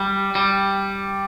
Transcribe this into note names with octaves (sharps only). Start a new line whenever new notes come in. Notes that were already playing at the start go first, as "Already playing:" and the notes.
Already playing: G3
G3